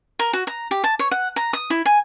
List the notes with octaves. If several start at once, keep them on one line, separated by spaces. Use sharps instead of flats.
A#4
F#4
A#5
G4
A5
C#5
F#5
A#5
D#6
E4
G#5